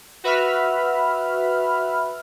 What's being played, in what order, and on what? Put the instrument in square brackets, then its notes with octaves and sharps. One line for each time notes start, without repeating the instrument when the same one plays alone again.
[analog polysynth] F#4 B4 E5 B5 F6